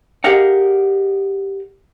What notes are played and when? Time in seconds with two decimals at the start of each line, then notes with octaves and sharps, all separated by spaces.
0.24 G4 G#4 A#4 D#5 F5 F#5